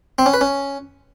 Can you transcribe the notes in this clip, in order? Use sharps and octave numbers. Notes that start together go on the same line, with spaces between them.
C4
C#4
B4
C#4